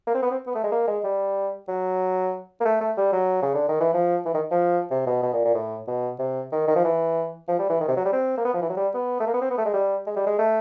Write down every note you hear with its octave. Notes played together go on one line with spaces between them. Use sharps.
A#3
C4
B3
C4
B3
A3
G#3
A#3
G#3
G3
F#3
A#3
A3
A3
G3
F#3
C#3
D3
D#3
E3
F3
E3
D#3
F3
C3
B2
B2
A#2
A#2
A2
B2
C3
D#3
D#3
F3
E3
F3
G3
E3
D#3
C3
F#3
G3
C4
A#3
B3
F3
E3
F#3
G3
B3
A3
A#3
B3
C4
B3
A3
G#3
G3
G#3
G3
G#3
A3